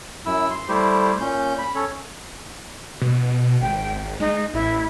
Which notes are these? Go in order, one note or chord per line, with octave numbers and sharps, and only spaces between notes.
F#2 E4 E6
C6
G3 A3 E4 G4 C5
A#2 C#4 G6
B5
C#4 A4 C#5
B2
G#1 G5
G#3 D#4
A1 E4